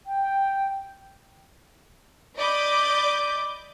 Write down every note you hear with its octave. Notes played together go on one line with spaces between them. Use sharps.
G5
D5 D#5 B5 D6 G6